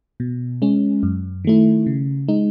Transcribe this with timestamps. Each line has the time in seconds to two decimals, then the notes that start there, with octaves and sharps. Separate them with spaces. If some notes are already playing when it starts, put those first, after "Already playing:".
0.20 B2
0.62 G#3 C#4
1.03 F#2
1.45 D#3 A3 E4
1.87 C#3
2.28 G#3 D#4